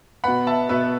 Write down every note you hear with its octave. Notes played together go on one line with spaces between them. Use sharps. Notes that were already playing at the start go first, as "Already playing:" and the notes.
B2 B3 F#5 B5
E5 A5
B2 B3 B4 E5